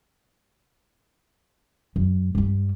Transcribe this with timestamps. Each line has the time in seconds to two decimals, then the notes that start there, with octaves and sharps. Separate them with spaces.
1.96 F#2
2.35 G2 G3